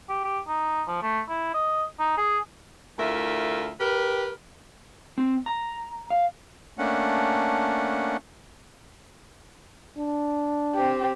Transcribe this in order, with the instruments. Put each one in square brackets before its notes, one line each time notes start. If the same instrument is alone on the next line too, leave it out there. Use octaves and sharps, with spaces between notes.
[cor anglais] G4
G4
D#4
F3
A3
E4
D#5
D#4
G#4
[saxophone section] D2 A3 E4 F4 A#4 E5
G4 A#4 B4
[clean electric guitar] C4
A#5
F5
[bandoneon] A3 A#3 C#4 D4 F#5
[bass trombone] D4
[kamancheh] C4 G4